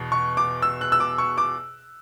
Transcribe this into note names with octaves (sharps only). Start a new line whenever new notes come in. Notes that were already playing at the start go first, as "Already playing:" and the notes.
Already playing: E2 B2
C#6
D6
E6
F#6
E6
D6
C#6
D6